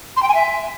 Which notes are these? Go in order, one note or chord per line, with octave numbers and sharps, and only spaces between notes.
C6
G5
G#5
E5